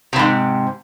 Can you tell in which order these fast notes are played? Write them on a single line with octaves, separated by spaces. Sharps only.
C3 E2 G#2